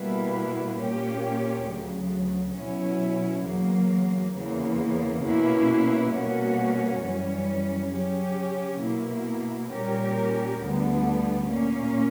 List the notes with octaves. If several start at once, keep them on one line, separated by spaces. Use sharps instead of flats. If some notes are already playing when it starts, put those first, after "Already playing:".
Already playing: B2 G3 A#3 E4 B4
A#2 A#3 C#4 G4
D2 C#3 F#3
B2 F#3 C#4 E4
E2 C#3 F#3 A#3
E2 C#3 E3 A#3
B2 A#3 C#4 E4 B4
B2 G3 A#3 C#4 F#4
F#2 E3 G3 C#4
C#3 F#3 C#4 G4
B2 A#3 E4
A#2 G3 C#4 G4 A#4
D2 D3 G3 B3
A#2 A#3 C#4